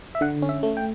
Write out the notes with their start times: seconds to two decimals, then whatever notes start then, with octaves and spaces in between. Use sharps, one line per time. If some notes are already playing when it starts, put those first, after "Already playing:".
0.15 E5
0.21 D3 F#5
0.42 C#4
0.49 E5
0.63 A3
0.77 G5